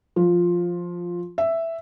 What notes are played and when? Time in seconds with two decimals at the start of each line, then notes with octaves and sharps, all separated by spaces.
0.16 F3
1.38 E5